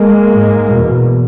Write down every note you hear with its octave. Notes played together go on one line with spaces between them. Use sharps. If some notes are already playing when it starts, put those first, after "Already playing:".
Already playing: G#3 A#3
G#2
E2 B2